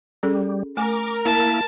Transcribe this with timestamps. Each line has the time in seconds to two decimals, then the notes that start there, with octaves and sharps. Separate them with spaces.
0.23 G3 C#4 G#4 A4
0.77 A3 A#4 G#5 D6
1.25 A#3 E4 A5